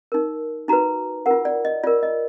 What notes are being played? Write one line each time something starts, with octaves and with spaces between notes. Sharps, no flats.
D#4 A#4
D#4 F#4 B4 A#5
F4 A#4 F#5
D5
D#5
F4 A#4 D5
D#5